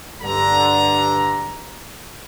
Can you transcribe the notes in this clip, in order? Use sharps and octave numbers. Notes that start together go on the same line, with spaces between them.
G2 D3 A#5